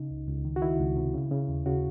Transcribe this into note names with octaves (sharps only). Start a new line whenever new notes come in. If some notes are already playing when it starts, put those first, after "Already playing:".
Already playing: C#3 D#4
C#2
C#2
D#3
F#4
D#3 E4
C#2
C3
C#3
C#3
D#2
C#3 F#4